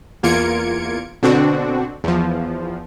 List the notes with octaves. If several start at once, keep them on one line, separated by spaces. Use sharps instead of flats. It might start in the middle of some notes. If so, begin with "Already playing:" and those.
E2 A#3 F4 G#6 C#7 D7
B2 D3 C4 D4 F#4
E2 F3